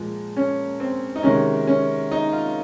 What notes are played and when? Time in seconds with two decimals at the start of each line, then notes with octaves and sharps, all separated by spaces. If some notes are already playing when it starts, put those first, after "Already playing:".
Already playing: A#2 F3 G#3
0.36 C#4
0.80 C4
1.16 D#4
1.23 C3 D#3 G#3 C#4
1.67 C#4
2.11 D#4
2.33 F4